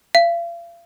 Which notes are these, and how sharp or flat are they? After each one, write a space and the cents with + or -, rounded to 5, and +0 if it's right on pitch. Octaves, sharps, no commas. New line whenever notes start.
F5 -40